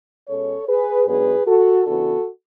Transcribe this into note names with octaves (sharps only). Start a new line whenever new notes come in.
B2 G#3 C#4 A4 C#5
G#4 B4
G#2 F#3 B3 D4 G#4 B4
F#4 A4
C#3 E3 B3 D4 F#4 A4